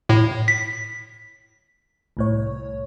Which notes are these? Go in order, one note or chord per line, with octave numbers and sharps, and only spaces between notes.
A2
B6
C2 A2 C#5